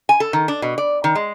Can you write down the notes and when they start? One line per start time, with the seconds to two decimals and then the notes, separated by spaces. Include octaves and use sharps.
0.09 G#5
0.20 A4
0.33 D#3
0.48 D4
0.62 B2
0.78 D5
1.04 D#3
1.15 G#3